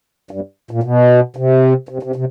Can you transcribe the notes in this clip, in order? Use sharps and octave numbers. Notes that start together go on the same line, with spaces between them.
G2
A#2
B2
C3
C3
C3
C3